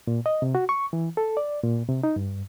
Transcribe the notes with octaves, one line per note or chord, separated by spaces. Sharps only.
A#2
D#5
C3
F#4
C#6
E3
A4
D5
A#2
C3
D#4
G2